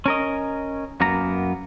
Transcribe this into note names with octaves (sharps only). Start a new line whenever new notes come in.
C#4 A#4 D#5
F#2 A#3 B3 A#5